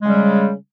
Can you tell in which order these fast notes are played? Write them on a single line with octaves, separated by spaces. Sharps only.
G#3 C#3 G3